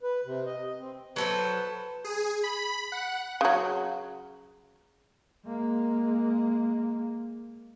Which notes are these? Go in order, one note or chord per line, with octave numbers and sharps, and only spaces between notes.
B4
C3
D#5
C4
F#3 A4 B4 C5
G#4
B5
F#5
C#3 F#3
G#3 A#3